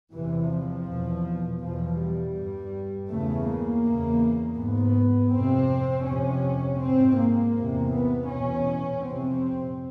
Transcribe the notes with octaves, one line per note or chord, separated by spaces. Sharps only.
E2 C3 E3
F3
E2 B2
E2 B2 F3
G3
G2
E2 C#3 A3
A#3
E2 C#3
G#2 B3
F2 C3 C4
F2 C3 C#4
G#2 C4
A#3
E2 C3
B3
E2 B2 C#4
F2 C3 C4